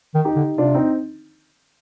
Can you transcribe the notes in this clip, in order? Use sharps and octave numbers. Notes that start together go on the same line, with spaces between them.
D#3
D#4 G4
D3
C3 D4 F4
C4 D#4